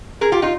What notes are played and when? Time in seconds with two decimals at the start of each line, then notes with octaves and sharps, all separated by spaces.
0.21 G#4 A#4
0.32 F4 G4
0.42 D#4 F4